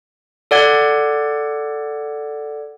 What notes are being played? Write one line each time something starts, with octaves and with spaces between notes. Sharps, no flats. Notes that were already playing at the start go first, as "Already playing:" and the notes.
A4 D5 F#5 G#6